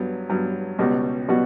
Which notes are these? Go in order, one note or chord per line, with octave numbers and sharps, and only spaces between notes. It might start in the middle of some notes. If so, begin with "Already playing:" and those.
Already playing: G2 F#3 B3
G2 F#3 B3
C#2 B2 G3 B3 F#4
B2 G3 B3 F#4